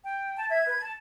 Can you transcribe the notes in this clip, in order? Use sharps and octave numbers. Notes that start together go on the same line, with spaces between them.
G5
A5
E5 G#6
B4
A5